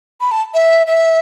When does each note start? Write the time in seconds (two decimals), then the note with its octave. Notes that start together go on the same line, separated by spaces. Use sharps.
0.21 B5
0.31 A5
0.54 E5
0.87 E5